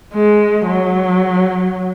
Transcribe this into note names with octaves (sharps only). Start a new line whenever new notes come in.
G#3
F#3